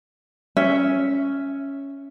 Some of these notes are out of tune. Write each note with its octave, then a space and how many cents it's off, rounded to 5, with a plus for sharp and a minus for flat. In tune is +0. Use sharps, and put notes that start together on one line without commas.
C#4 +0 E5 +0